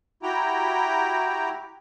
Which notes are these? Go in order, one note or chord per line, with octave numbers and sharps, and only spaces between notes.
E4 F#4 G4 G5 A#5